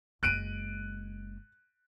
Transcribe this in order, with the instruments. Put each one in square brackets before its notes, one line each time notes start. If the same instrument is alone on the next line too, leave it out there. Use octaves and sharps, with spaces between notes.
[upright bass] F#1 G#3 [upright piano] F#6 D7 D#7